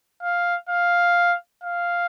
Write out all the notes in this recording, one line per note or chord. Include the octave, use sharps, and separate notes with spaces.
F5
F5
F5